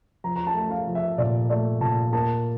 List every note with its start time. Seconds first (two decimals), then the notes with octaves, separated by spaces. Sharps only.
0.24 F3 A#5
0.36 A#5
0.47 A5
0.55 A3
0.71 F5
0.87 F3
0.95 E5
1.18 A#2 D5
1.50 A3 D5
1.81 A#2 A5
2.13 A#3 A5